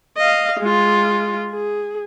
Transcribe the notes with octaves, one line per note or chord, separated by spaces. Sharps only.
D#5 F5
G#3 F4
G#4